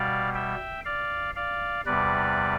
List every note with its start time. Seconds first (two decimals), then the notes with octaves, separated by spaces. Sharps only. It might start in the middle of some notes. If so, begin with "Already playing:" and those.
Already playing: B2 G3 D5 F5
0.35 E5 G5
0.85 D5 F5
1.35 D5 F5
1.86 E2 C3 G3 B4 D5